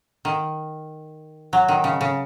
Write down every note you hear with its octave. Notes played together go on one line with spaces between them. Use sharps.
D#3
F#3
D#3
C#3
C#3